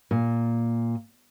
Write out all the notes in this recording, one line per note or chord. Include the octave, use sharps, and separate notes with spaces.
A#2